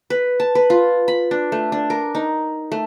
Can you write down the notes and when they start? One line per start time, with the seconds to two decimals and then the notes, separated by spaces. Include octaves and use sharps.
0.10 B4
0.40 A5
0.55 B4
0.70 F4
1.08 B5
1.31 D4
1.52 A3
1.72 D4
1.90 A#4
2.15 D#4
2.72 A3